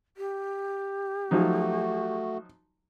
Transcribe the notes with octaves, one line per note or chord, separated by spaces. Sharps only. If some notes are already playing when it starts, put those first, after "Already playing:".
G4
F3 F#3 A3 D#4 F#4